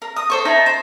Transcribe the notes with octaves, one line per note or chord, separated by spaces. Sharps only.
A#4
D#6
A4 C5 C#6
D#4 E4 G#5 A5
C5